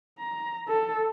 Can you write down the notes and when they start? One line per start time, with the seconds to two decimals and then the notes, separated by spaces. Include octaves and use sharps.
0.19 A#5
0.68 A4